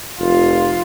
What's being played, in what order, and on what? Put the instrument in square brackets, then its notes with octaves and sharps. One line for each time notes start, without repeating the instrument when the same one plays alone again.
[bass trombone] F1 [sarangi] F4